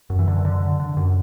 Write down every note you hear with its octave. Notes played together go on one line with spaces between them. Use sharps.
F#2
E3
F#2 D3
D3
D3
D3
F#2